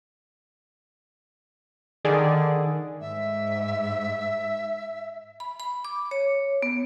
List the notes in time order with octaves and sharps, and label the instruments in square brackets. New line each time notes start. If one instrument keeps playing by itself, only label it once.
[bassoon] D3 [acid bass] D#3 [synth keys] G#4 D5
[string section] G#2 [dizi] E5
[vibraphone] B5
B5
D6
C#5
B3